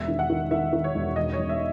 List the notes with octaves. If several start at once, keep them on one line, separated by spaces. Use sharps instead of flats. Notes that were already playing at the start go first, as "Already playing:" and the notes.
Already playing: E1 E5
D#3
F#5
D#3
D#3 E5
D#3
C#5
E1
E1 D#5
C#5
E1
E5